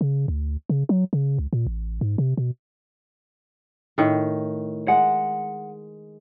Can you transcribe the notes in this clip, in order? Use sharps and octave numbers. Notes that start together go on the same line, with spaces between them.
C#3
D2
C#3
F#3
C#3
C#2
A#2
A1
G#2
C3
B2
A2 D#3
G#3 F#5